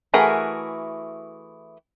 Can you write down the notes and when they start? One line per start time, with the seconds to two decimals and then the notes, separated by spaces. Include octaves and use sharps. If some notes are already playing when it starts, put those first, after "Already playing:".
0.14 E3 A3 F#4 G#4 A#4